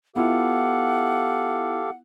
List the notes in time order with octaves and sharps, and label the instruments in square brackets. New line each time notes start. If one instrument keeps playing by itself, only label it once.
[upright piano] B3 E4 F4 [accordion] G4 A4 F5 [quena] F#5